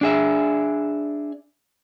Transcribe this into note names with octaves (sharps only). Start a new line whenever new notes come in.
D4 G#4 E5